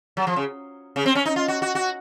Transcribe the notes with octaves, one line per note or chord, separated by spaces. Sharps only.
F#3
F3
C#3
C#3
C4
C#4
D#4
F4
F#4
F#4
F#4